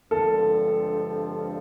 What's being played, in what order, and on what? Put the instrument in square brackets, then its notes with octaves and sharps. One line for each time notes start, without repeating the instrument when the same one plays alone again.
[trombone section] G2 D3 F3 G#3 C4 [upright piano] A4